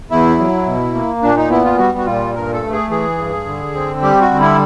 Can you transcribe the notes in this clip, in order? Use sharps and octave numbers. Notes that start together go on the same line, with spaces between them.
E2 E4
F#3
B2
A#3
A#2 D4
D#4
B3 E4
F4
G3 F#4
F#4
A#2 F4
G2 A#4
A4
A3
G#4
E3 G#4
G2
D3
C4
G3 G4
F#4
D3
E4